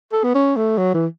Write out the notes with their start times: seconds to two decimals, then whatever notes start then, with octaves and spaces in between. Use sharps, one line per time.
0.13 A4
0.24 B3
0.35 C#4
0.57 A3
0.78 F#3
0.94 E3